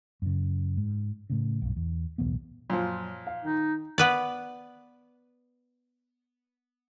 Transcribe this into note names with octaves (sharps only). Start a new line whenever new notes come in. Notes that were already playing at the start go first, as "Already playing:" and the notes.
F#2 C#3
G#2
A2 C#3
B1 G2
E2
D1 B1 E2 B3
F#2 A#2 F3
F5
D#3 D#4
B3 B4 D5